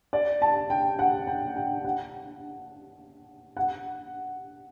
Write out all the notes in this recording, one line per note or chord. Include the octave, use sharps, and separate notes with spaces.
D5
A5
G5
F#5
G5
G5
F#5
F#5